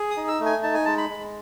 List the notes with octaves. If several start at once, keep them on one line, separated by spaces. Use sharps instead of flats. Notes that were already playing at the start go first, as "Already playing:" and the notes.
Already playing: G#4
D#6
D#4
E6
A3
G#5
D#4 A5
G#5
G#3 A5
B5
G#3